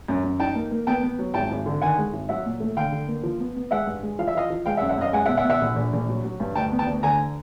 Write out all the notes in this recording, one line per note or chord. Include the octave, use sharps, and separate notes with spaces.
F#2
F#2
D#4 G5 A5
A#3
A#3
B3 G5 A5
B3
F#3
G#1 G5 A5
G#1
D3
D#3 F#5 G#5
G#3
G#1
F#3 E5 F#5
A#2
A3
D3 F5 G5
D3
A#3
F3
B3
B3
G#3 E5 F#5
G2
G#3
F3 F5
E5
F3 D#5 F5
F3
G#3 F5 G5
E5 F#5
F#2
E5 F#5
F#2 D#5 F5
G#3 F#5 G#5
E5 F#5
B2
E5 F#5
B2
E5 F#5
A#1
A#1
A#1
F#3
F#3
G2
D2 G5 A5
B3
G5 A5
D2
D3 G#5 A#5